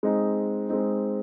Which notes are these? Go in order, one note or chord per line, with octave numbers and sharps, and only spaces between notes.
G#3 C4 D#4
G#3 C4 D#4